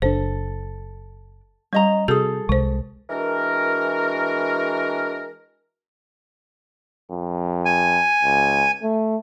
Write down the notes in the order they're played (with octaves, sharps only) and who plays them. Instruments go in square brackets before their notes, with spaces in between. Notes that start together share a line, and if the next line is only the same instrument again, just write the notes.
[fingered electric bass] F#1 D4 [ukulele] A4 [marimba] C5
[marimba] G3 [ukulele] C#4 D#5 A#5
[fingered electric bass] C3 [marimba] F#4 G6 [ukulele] G#4 A4
[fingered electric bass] C2 G#3 [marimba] C3 C5
[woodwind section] E3 G#3 D4 F#4 A#4
[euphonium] F2
[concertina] G#5
[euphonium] C#2
A3